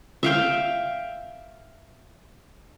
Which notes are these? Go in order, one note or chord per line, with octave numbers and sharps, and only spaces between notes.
E5 F5 G5